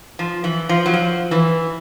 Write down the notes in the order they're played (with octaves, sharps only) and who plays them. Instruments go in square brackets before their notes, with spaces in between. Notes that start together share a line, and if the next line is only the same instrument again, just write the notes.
[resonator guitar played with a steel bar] F3
E3
F3
F#3
F3
E3